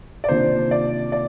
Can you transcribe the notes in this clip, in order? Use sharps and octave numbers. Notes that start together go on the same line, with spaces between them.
D5
C3 D#3 A#3 D4 F4 C5
D5
D5